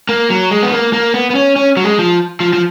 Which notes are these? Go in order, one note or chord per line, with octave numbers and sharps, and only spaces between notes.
A#3
F#3
G#3
B3
A#3
A#3
B3
B3
C#4
C#4
F#3
G#3
F3
F3
F3